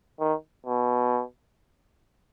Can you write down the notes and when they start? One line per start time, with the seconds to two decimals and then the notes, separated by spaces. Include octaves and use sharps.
0.20 D#3
0.66 B2